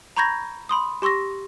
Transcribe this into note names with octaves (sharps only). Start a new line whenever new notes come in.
A#5 B5 C#6 G6 G#6 A#6
B5 C6 D#6
G4 C6 C#6 E6 A#6